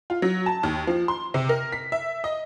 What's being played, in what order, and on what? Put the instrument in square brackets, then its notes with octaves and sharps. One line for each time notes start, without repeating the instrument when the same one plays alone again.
[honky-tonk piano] F4
F#3
A5
D#2
F3
C6
C3
A#4
B6
E5
D#5